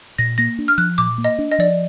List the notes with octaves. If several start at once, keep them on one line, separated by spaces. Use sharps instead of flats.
A#2 A#6
A#3 A#6
D4
F6
F3 F#6
A#2 D6
A#3
D#5
D4
D#5
F3 D5